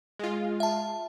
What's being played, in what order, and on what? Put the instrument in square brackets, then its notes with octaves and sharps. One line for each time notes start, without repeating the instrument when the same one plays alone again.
[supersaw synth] G#3 F4
[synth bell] E5 A5